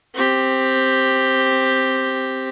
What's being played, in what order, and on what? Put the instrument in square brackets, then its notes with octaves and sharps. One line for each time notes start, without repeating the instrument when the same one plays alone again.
[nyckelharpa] C4 G4